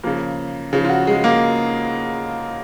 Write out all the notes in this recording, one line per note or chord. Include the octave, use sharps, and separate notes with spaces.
C#3 F3 A#3
C#3 F3
F4
F#4
G#3
A#3